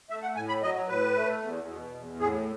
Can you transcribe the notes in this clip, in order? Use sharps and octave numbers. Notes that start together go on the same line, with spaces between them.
A3 E5
F#5
A2 G#5
B5
F#3 D#5
A2 B4
A3
E2
B2
E2
A2 G#4